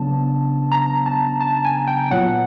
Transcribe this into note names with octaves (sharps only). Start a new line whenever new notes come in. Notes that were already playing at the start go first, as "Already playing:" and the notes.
Already playing: C#3 F#3 B3 D4 A5
A#5
A5
A5
G#5
G5
G5
A#2 F#3 B3 F#5